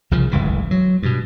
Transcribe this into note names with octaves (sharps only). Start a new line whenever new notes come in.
C2 C#3 F3
D1 G1 C#2 E3
F#3
G2 B2